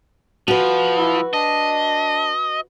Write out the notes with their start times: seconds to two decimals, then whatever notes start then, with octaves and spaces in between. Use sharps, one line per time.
0.48 F3 F#4 B4
0.96 E4
1.34 D4 D#5